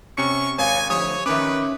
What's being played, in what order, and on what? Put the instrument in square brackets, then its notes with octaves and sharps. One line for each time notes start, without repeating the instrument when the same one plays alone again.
[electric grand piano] C3 C#4 C#7 [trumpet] C#6
[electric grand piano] G#1 [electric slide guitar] C#5 F5 [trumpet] G#5
[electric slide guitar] D3 F3 G4 [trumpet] C#5 [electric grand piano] D#6
[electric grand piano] D#3 D6 [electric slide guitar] C#4 C#5 E5 [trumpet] B4